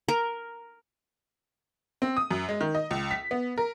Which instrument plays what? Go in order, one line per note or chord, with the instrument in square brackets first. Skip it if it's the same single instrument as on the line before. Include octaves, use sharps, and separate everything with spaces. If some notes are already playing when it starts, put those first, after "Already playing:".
[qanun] A#4
[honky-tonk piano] C4
D#6
F#2
G#3
D#3
D#5
C#2
B6
B3
A#4